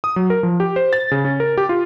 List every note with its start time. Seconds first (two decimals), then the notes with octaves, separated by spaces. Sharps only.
0.04 D#6
0.16 F#3
0.30 A#4
0.43 F3
0.60 G4
0.76 C5
0.93 A6
1.11 C#3
1.25 C#4
1.40 A#4
1.58 G4
1.69 F4